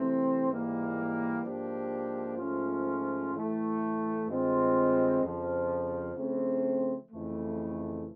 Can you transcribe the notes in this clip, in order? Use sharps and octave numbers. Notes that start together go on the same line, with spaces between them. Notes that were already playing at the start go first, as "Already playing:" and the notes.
Already playing: C3 E3 A3 C4
G#2 E3 G3 A#3
G#2 F3 A#3 D4 G4
G#2 F3 A3 C#4 F4
A2 E3 A3
G2 D#3 G#3 C4 F4
F2 C#3 F3
C#3 F3 A3 C4
F2 C#3 E3 A3